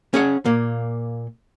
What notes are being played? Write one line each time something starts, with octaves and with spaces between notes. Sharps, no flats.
C#4 G#4 F#5
A#2 A#3